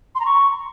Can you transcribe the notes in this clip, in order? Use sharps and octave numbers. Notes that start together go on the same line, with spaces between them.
C6
A#5
C#6